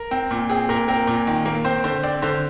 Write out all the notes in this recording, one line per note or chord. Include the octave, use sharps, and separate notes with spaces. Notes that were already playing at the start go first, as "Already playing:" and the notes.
Already playing: A#4
C4
A#2
C4 G#4
A#2 A#4
C4 A#4
A#2
D#3
A#3
C4 C5
D3 C5
C4 D5
D3 C5